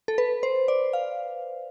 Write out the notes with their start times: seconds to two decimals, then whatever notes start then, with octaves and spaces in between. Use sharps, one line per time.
0.08 A4
0.18 B4
0.43 C5
0.68 D5
0.93 F5